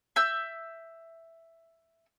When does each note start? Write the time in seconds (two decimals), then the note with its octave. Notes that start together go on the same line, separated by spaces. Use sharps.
0.16 E5 E6 G6